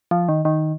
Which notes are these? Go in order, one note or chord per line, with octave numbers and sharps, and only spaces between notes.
F3
D#3
D#3